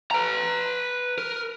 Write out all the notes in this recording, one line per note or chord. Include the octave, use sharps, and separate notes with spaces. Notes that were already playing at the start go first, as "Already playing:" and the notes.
B4 A#5
A#4